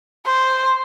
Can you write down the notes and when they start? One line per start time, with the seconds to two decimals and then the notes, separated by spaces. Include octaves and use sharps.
0.26 C5